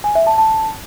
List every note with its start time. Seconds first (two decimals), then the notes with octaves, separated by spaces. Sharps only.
0.04 G#5
0.15 E5
0.27 A5
0.38 A5